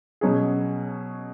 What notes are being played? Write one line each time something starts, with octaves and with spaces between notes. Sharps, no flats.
B2 F#3 C#4 G#4